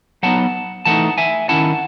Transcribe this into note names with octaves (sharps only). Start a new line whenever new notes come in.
F#3 B3 D#4 F#5 A5
E3 A3 D#4 F#5 A5
E5 G#5
D#3 G#3 C#4 E4 F#5 A5